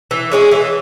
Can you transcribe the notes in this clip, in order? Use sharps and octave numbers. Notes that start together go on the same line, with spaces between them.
E3
G#3 C#4 G#4
E3